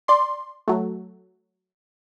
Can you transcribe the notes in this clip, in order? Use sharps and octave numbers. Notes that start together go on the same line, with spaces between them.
D5 C6
F#3 A3